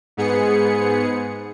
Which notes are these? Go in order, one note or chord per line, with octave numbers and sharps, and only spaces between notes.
G#2 B3 G#4 C#7